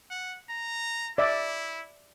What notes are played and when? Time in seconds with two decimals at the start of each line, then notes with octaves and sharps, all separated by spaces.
0.11 F#5
0.50 A#5
1.18 E4 D5 E5